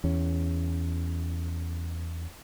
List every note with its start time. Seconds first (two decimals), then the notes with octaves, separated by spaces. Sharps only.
0.04 E2 C#4